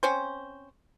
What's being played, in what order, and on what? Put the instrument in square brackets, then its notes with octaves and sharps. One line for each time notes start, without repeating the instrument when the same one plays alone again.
[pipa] C4 C#4 C5